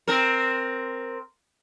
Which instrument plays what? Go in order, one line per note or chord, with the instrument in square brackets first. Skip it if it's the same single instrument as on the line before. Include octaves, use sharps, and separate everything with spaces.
[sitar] C4 A#4